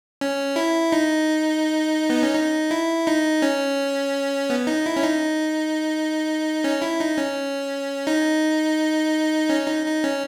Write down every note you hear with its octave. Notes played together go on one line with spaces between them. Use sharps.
C#4
E4
D#4
B3
C#4
D#4
E4
D#4
C#4
B3
D#4
E4
C#4
D#4
C#4
E4
D#4
C#4
D#4
C#4
D#4
D#4
C#4